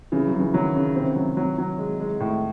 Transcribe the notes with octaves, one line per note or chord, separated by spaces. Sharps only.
C#3 E3
F#3
C#3
E3
D#3 F#3
C#3
C3 C4
F#3
F#3
F#3
G#3
G#3
A2